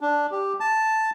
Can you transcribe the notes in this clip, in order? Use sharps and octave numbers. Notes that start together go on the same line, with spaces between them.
D4
G4
A5